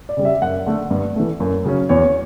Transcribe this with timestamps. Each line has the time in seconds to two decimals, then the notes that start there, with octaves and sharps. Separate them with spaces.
0.09 D5
0.17 C#3 G3
0.25 E5
0.42 F#2 F#5
0.66 D3 A3
0.91 G2
1.16 E3 A3
1.40 F#2
1.65 C#3 F#3 C#4
1.89 E2 C#5